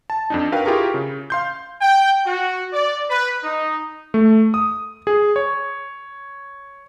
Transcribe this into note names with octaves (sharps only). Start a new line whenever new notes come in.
A5
F2 D4 D#4
F#4 A#4 B4 F5 G5
E4 F4 G4 G#4 A#4 C#6
C#3
F5 C6 G6
G5
F#4
D5
B4
D#4
A3
D#6
G#4
C#5